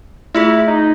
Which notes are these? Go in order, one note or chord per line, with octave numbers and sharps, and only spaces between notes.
A3 E4 F4 G#4
D#4